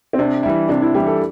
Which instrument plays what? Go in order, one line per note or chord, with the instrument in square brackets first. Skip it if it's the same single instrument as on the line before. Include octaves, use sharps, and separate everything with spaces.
[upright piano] C4
[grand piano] C3 [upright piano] D4
[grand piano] E3 G3 E4
[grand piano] C3 [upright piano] D4
[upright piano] E4
[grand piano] E3 G3 E4 [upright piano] G4
[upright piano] A4